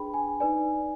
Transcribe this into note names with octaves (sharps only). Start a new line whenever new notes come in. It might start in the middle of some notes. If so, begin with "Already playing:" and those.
Already playing: D4 G#4 B4 G5 B5
G#5
D#4 B4 D5 G#5